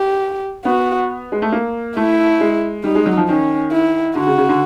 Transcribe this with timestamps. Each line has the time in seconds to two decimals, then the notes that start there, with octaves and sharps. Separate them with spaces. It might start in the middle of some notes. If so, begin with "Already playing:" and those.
Already playing: G4
0.65 B3 F#4
1.32 G#3
1.42 A3
1.52 A#3
1.97 A3 E4
2.41 G#3
2.84 G3 D#4
2.95 G#3
3.06 F#3
3.17 F3
3.29 D#3 C#4
3.72 E4
4.15 D3 F#4
4.27 C#3
4.38 C#3
4.49 D3